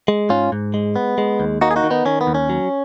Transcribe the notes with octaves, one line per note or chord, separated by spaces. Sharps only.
G#3
G#2 C#4 F4
G#2
G#3
B3
G#3
D#2
A#3 D#4 F#4
G#4
D#4 F#4
D#3
B3 D#4
D#3 C#4
B3
D#2
C#4
F#3